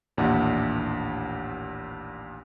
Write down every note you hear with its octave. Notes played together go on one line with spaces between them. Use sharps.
A1 D#2 A#2 D4 E4 F#5